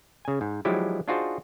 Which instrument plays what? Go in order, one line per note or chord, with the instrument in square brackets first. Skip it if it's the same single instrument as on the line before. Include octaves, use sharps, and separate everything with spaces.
[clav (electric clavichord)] C#3 G#5
G#2
F3 F#3 G#3 D4 E4 G4
D4 D#4 F4 F#4 G#4 C5